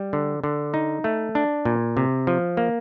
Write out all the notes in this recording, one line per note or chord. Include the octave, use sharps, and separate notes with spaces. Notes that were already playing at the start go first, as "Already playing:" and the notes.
Already playing: G3
D3
D3
D#4
A3
D4
A#2
C3
F3
A#3